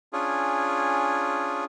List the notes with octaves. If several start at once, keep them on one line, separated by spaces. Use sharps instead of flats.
C#4 D4 F4 G#4